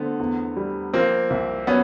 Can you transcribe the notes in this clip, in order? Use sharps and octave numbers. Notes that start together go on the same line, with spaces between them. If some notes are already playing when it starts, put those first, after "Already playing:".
Already playing: D3 A3 B3 C4
E2
G3
F3 A#3 C4
C2
F#3 B3 C#4